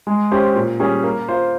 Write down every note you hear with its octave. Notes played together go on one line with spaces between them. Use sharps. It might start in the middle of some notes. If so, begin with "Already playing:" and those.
G#3
C#4 G4 C5
A#2
G3 C#4 G#4
A#3
F4 C5